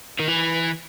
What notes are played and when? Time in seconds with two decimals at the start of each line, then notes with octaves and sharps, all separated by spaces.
0.20 D#3
0.28 E3